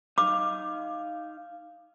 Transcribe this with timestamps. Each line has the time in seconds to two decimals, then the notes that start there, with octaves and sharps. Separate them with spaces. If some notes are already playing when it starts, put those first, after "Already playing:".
0.18 D#4 F5 D6